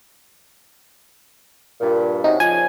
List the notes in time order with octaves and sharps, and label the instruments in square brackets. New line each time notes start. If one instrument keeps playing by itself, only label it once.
[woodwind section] G2 A#2
[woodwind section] C3 C#4 F#4 [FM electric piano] D#4
[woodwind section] A#2 C#3 F3 [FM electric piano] G#5